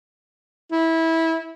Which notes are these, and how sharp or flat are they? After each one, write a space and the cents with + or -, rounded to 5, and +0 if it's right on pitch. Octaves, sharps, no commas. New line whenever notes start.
E4 -20